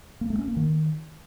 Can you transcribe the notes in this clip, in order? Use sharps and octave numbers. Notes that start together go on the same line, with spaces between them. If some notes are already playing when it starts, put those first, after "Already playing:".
A#3
A3
C#4
A#3
D#3